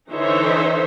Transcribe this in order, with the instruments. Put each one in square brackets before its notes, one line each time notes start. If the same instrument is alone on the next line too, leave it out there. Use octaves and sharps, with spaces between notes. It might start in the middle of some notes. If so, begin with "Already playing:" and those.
[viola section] D3 E3 D#4 C5 C#5 E5